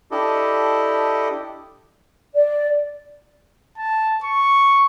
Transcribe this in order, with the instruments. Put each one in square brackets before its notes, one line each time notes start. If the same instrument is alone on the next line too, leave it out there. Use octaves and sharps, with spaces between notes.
[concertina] D4 E4 G4 A4 D#5
[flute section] D5
[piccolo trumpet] A5
C#6